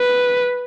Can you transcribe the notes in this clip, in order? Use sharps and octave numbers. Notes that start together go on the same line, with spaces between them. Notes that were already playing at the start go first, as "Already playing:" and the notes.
Already playing: B4